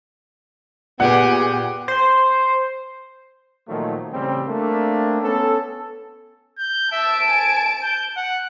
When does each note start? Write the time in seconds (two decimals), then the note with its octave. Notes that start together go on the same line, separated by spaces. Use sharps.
1.00 A#2 B3 G4 G#4 F#5
1.88 C5
3.68 A#2 D#3 F3 F#3 A3
4.12 A1 C#3 G3 C4
4.47 A3 A#3 C4 D4
5.22 B3 C#4 A4
6.58 G6
6.92 E5 A5 D7
7.28 G#5
7.82 G6
8.17 F#5